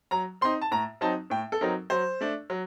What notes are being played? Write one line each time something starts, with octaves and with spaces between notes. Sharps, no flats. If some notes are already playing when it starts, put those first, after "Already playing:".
F#3 A#5
C4 D#4 C6
A5
A2 A#5
F#3 C4 D#4 A5
A2 G5
A4
F#3 C4 D#4 A#4
F#3 C5
A3 D4
F#3